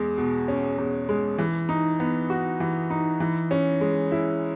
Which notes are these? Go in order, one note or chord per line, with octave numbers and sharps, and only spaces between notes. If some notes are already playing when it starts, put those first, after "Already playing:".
Already playing: E2 G#3
B2
C#4
E2
G#3
E3
D#4
B3
F#4
E3
D#4
E3
C#4
G#3
E4